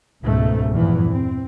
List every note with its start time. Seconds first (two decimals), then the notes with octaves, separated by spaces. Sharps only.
0.23 C#2 G#2 B2 A3
0.71 E2 G2 A#2 E3 F3
1.10 C4